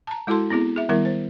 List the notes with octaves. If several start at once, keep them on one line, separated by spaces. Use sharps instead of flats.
A5 A#5
G#3 E4 F#4 A4 A5 C6
B3 C4 E4 G#4
G#4 E5
D#3 G3 B3 E4 A#4 E5
C5